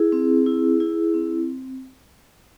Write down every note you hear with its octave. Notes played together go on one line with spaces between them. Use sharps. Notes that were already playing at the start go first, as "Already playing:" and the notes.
Already playing: E4 G#4
C4
E4
E4
C4